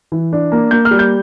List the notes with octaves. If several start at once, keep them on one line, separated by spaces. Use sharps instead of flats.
E3
D4
A#3
A#3 G6
F6
G3
G6